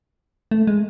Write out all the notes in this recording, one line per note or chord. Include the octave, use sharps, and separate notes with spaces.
A3
G#3